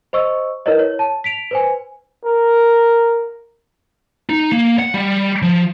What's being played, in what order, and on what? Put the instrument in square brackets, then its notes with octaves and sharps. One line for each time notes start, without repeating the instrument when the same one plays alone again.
[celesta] C5 D#5 C#6 E6
E4 A#4 B4 C#5 D#5
C#5
A5
B6 D7 F7
B4 C5 G#5
[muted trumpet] A#4
[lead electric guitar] D#4
A#3
F#5
G3
F3